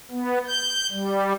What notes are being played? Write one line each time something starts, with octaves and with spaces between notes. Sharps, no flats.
B3
G6
G3